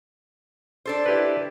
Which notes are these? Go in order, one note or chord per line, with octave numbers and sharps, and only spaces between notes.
D4 A4 C5
E4 G4 B4